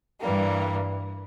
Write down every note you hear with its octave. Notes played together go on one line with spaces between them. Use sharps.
G2 E3 G3 A#3